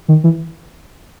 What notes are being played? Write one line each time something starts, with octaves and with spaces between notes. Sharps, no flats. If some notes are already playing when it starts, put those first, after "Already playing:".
D#3
E3